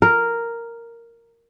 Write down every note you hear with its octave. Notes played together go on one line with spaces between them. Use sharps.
A#4